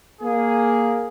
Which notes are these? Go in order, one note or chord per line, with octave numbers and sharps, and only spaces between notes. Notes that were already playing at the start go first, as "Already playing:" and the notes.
A#3 G#4